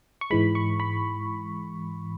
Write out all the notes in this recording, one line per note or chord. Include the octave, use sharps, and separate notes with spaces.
C#6
G#2 E3 G#3 B5
C#6
B5